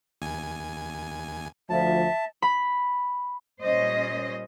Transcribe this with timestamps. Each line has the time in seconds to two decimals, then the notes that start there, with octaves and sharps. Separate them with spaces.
0.22 D#2 G#5
1.70 D2 F3 E5 A5
2.42 B5
3.62 A#2 G3 C#4 C5 D#5